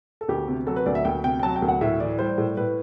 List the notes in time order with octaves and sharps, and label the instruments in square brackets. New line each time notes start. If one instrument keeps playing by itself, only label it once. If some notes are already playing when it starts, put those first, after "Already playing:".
[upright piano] A4
D2 G4
C3
F#3 A4
B4
D2 D5
E5
D2 G5
C3 G5
G5
F#3 A5
G5
D2
F#5
A2 E5
E3 D5
G3 C5
A2
A2 B4